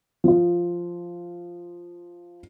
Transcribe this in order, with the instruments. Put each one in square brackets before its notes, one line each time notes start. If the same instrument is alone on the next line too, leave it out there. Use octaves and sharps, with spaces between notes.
[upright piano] F3 F4